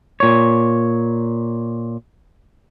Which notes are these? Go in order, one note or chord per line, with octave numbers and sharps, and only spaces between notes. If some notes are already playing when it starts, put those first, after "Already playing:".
A#2 C#5